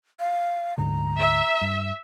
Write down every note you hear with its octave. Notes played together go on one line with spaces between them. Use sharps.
F5
D2 G#2 D3 A#5
E5
G2